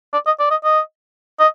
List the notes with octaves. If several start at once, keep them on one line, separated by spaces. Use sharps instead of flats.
D5
D#5
D5
D#5
D#5
D#5